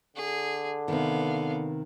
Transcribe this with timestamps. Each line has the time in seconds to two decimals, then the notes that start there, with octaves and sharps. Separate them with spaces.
0.16 D3 G#4
0.88 C3 D#3 B3 F5